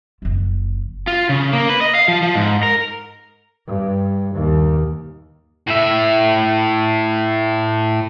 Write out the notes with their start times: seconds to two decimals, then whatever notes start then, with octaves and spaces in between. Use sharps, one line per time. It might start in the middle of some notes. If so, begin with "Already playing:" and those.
0.22 F#1 F3
1.07 F4
1.29 C#3
1.53 A#3
1.69 B4
1.81 D#5
1.95 F5
2.08 F3
2.23 F3
2.35 G#2
2.63 A#4
3.67 G2
4.35 D#2
5.67 A2 E5